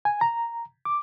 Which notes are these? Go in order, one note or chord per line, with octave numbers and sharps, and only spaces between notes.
G#5
A#5
D6